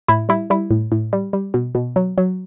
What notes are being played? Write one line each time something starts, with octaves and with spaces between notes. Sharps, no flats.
A2 E4
G3 E4
G3 E4
A2
A2
G3
G3
B2
B2
F#3
F#3